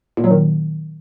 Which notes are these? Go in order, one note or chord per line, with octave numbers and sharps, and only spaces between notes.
A#2
F#3
D#3